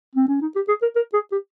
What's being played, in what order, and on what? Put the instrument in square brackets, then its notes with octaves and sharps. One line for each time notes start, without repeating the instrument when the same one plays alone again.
[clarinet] C4
C#4
D#4
G4
G#4
A#4
A#4
G#4
G4